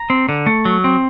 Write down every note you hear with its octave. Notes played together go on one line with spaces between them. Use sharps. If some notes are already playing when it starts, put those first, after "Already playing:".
Already playing: A#5
C4
D3
A3
F#3
C4